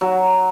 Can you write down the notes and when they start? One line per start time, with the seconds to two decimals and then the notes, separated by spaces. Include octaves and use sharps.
0.01 F#3